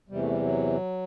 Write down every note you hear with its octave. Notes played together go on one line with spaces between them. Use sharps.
E2 C3 E3 G3
A3
G3
F#3